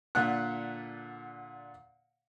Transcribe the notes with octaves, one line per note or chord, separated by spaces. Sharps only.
A#2 D3 F#5 F#6